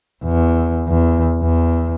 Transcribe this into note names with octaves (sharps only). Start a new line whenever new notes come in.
E2
E2
E2